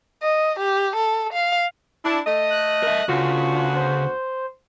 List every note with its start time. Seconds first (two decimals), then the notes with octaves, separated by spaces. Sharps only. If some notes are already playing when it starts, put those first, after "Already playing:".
0.22 D#5
0.59 G4
0.96 A4
1.33 F5
2.04 D4 E4
2.26 A3 D#5
2.50 F#6
2.83 A#4 E5
3.09 D2 C#3 B3 F4 F#4
3.75 C5